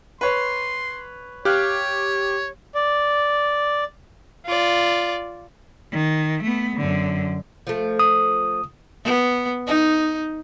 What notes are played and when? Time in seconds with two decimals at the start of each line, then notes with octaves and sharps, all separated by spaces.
0.21 B4 C#5 C6
1.45 G4 C#5 F5 F6 F#6
2.75 D5
4.46 F4 D5
5.93 D#3
6.43 A3 B3
6.76 F#2 D3
7.67 F3 A3
8.00 D#6
9.04 B3
9.67 D#4